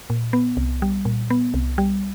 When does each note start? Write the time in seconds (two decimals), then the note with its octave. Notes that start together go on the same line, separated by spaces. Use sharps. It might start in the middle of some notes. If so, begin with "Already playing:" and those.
0.10 A#2
0.33 B3
0.57 C2
0.82 G3
1.05 A#2
1.30 B3
1.54 C2
1.78 G3